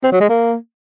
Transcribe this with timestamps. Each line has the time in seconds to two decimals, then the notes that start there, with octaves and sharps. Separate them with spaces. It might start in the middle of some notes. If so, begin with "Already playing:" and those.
0.04 C4
0.12 F#3
0.21 G#3
0.29 A#3